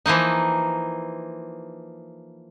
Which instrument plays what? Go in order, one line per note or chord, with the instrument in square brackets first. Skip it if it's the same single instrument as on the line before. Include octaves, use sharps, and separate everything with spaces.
[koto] E3 F3 A#3 D#4